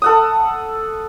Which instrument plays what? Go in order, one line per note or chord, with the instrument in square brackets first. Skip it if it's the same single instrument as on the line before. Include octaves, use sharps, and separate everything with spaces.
[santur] A4 F#5 D#6